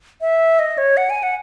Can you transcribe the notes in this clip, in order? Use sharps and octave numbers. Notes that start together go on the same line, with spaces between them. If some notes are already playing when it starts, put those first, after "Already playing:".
E5
D#5
C#5
F#5
G#5
F#5